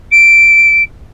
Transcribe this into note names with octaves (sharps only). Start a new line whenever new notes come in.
D7